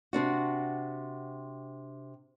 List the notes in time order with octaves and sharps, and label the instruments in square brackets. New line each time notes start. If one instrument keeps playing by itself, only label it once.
[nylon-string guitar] C3 C4 D4 F#4